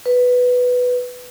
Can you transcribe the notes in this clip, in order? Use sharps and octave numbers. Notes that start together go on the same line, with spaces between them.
B4